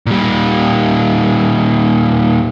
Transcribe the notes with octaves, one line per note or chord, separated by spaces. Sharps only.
A#2 G3